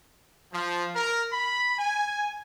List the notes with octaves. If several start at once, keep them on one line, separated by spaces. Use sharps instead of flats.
F3
A#4
B5
G#5